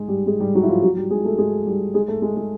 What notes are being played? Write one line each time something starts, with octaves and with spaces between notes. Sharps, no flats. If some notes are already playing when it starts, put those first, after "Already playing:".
Already playing: G#3 G#4
G3 G4
G#3 G#4
G3 G4
F#3 F#4
E4
F3 F4
F#3 F#4
G3 G4
G#3 G#4
A3 A4
G#3 G#4
G3 G4
G#3 G#4
A3 A4
G#3 G#4
G#3 G#4